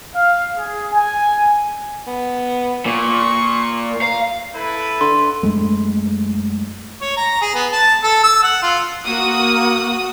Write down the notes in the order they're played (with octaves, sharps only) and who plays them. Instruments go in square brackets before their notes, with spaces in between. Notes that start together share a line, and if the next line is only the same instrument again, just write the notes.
[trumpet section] F5
G#4
G#5
[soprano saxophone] B3
[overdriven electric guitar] A#2 [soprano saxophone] C#6
[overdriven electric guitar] F5 [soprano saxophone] A#5
[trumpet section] E4 A4 B4
[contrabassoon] D3 [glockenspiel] C6
[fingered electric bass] F#2 G#3 A3
[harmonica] C#5
A#5
G#4
B3
A5
A4
E6
F#5
F4
[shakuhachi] A#3 [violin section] F#4 D#6